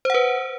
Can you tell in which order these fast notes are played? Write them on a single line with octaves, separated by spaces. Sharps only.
C5 F#5 B4